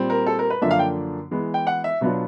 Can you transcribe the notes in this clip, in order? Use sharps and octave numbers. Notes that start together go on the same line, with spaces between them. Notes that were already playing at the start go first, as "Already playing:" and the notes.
Already playing: A#2 G3 C4
A#4
A4
A#4
B4
F#2 D3 F3 A#3 D4 E5
F5
G5
E3 G#3 B3
G5
F#5
E5
B2 F#3 B3 D4 F4